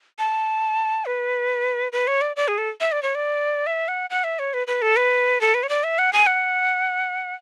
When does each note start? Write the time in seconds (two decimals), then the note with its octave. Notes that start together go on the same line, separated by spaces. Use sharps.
0.19 A5
1.06 B4
1.92 B4
2.07 C#5
2.21 D5
2.36 D5
2.48 G#4
2.58 A4
2.80 E5
2.92 D5
3.03 C#5
3.15 D5
3.67 E5
3.88 F#5
4.10 F#5
4.24 E5
4.39 C#5
4.54 B4
4.67 B4
4.82 A4
4.96 B4
5.41 A4
5.54 B4
5.63 C#5
5.69 D5
5.84 E5
5.99 F#5
6.13 G#5
6.27 F#5